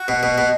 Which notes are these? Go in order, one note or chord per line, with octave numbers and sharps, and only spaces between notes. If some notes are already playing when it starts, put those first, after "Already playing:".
Already playing: F#4
B2
B2
B2